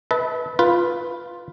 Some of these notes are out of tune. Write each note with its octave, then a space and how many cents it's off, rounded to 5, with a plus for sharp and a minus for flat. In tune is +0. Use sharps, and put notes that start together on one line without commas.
B4 +0 E5 -40 A5 +0
F4 +0 B4 +0